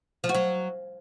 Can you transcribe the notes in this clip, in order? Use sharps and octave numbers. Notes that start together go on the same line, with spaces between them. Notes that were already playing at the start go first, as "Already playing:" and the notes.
F3
F#4
F#3